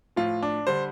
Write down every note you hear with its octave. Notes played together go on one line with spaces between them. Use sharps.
A2 F3 F4
D4
D3 G3 C5